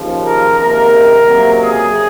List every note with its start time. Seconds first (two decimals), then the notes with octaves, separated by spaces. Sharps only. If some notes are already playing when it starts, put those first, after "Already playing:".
Already playing: D#2 C#3 F3
0.25 A#4
0.60 C#2 C3 D#3 A#3 A#4
1.27 C#2 C3 F#3 A#3
1.61 G#4